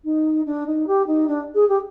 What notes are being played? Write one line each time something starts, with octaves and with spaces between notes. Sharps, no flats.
D#4
D4
D#4
G4
D#4
D4
G#4
G4